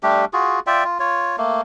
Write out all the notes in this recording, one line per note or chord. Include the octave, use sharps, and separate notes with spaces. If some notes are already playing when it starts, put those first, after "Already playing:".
G3 A3 D4 G4
F4 F#4 G#4
F4 D5 E5 G5
F4
F4 C#5
A3 A#3